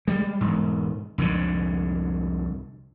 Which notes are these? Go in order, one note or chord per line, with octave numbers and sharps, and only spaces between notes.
G3 G#3
E1 G#2
C2 F2 G#2 D3